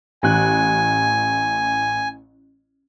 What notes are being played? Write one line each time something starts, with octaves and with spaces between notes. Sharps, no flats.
A1 G#5 F#6